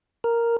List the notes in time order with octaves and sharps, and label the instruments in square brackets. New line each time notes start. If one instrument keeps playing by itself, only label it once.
[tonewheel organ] A#4